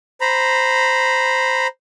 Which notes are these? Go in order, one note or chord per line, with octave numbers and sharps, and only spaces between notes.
C5 A#5 B5